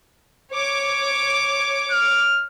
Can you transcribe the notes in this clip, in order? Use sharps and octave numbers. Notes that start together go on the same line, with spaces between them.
C#5 D6
F6